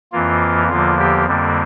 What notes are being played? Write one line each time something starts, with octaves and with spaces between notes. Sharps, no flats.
F2 E3 A#3 F4
E2 D3 F3 A#3 F4
G4
F2 D3 G3 A#3